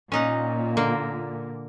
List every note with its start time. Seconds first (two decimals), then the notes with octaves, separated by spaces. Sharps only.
0.12 A#2 C#4 D#4 F#5
0.77 D3 A#3